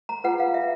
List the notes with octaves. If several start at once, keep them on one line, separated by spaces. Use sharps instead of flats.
A#5
F4 G#4 B4 F#5
F5
E5